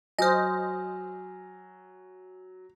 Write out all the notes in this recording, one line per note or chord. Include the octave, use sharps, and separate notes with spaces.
F#3 C5 D#5 G#5 F6